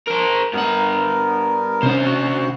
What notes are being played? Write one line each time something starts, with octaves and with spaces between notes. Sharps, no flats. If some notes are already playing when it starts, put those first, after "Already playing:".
A#4 C5
G2 B3 A#4 F#5
D2 C3 C#4 C5
F#4 F#5 F#6